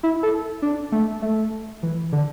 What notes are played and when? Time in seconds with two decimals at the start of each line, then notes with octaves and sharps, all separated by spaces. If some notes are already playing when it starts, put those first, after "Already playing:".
0.03 E4
0.23 A4
0.62 D4
0.92 A3
1.22 A3
1.83 E3
2.12 D3